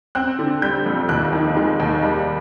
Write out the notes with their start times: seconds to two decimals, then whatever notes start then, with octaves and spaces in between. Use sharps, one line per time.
0.15 C4 F#6
0.39 D3
0.62 G3 G6
0.86 F2
1.09 D#2 F#6
1.33 D#3
1.56 G#3
1.80 D#2
2.02 G3